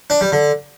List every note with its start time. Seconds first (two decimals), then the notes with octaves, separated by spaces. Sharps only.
0.10 D4
0.21 G3
0.32 D3